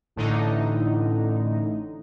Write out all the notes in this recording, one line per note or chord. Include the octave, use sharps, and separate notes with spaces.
A1 A2 D3 D#4